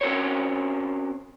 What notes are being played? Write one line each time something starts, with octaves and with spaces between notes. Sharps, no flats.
C4 C#4 F#4 A#4 C5 C#5